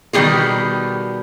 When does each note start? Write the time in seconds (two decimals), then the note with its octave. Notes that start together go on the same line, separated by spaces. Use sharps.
0.13 B2 D#3 G3 E4 G4 G#4